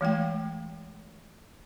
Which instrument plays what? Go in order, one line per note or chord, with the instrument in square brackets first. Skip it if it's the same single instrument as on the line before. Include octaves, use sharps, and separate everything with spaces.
[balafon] E3 G#3 A3 G5